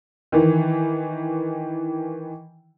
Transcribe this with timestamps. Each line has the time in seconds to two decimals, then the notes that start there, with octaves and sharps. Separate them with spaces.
0.32 D#3 E3